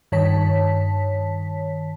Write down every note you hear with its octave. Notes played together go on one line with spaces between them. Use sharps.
G2 D#3 C#5 A5 B6